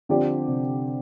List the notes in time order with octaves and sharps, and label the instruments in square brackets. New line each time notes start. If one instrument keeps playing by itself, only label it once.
[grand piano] D3 [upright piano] F3 C4 G4 D5
[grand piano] C3